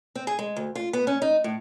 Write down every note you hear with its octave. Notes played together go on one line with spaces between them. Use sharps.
C4
G#4
G#3
D2
F4
B3
C#4
D#4
A2